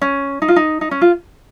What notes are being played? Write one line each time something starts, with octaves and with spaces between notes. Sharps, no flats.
C#4
D#4
F4
D#4
D#4
C#4
F4